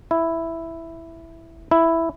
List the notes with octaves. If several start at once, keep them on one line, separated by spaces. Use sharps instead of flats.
E4
E4